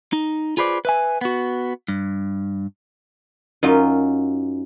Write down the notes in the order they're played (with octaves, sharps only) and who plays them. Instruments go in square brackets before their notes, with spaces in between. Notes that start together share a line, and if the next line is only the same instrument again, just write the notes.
[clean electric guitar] D#4
F4 G#4 B4 C5 D5
B4 E5 G#5
B3 F#4
G2
[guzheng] F#2 D#4 F4